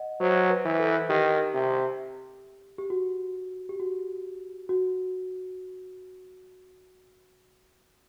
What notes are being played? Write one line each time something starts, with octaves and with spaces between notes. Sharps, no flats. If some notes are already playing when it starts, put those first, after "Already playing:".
Already playing: D#5 F#5
F#3 C5
B4
E3
A4
D#3 G4
C3
G4
F#4
G4
F#4
F#4